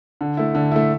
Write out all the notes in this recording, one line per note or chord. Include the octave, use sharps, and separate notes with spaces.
D3
A3 E4
D3
A3 E4